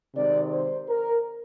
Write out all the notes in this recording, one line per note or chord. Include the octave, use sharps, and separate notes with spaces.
C3 D#3 G#3 D5
C5
A#4